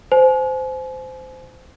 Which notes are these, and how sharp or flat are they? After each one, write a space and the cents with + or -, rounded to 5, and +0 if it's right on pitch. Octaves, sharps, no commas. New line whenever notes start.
C5 -15 G#5 +40